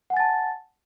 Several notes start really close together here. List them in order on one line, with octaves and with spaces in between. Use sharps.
F#5 G#5 A6 A5